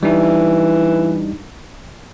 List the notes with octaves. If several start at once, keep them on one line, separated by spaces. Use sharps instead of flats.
E3 G3 D4 D#4